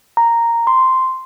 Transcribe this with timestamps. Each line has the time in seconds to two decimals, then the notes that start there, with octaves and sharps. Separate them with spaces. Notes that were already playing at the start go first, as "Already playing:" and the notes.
0.17 A#5
0.67 C6